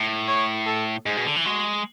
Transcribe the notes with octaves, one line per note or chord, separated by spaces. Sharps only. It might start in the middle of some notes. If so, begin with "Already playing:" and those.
Already playing: A2
C#5
A4
G#2 G#4
B2
D3
E3
G#3 F#4